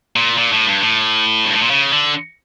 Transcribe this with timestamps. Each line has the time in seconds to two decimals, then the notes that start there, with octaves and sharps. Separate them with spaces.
0.16 A#2
0.38 A#2
0.52 A2
0.67 G2
0.82 A2
1.45 G2
1.53 A2
1.62 A#2
1.70 C#3
1.92 D3